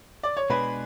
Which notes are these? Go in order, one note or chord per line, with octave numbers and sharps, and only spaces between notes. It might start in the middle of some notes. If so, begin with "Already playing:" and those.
D5
C#5
B2 G#3 D4 G#4 B4